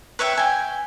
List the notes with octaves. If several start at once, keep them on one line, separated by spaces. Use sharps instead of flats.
B4 C#5 E5 G5
G5 G#5